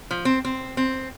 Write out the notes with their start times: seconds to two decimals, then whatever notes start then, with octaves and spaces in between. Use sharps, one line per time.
0.11 F3
0.25 C4
0.45 C4
0.77 C4